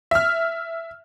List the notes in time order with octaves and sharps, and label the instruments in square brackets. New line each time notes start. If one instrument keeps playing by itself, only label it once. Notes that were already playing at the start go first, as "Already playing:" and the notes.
[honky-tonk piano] E5 F6